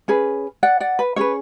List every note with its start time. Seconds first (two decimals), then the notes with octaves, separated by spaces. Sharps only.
0.08 C#4 G#4 B4
0.63 D5 F#5
0.80 D5 F#5
0.99 B4
1.16 C#4 G#4 B4 C#5